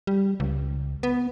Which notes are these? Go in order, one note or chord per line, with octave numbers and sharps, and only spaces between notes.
G3
C#2
B3